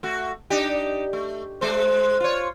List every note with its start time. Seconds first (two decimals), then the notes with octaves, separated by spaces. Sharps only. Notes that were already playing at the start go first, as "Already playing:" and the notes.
0.03 A3 F#4
0.50 D4 D#4 G4
1.13 A3
1.61 G#3 C5
2.20 F4 C#5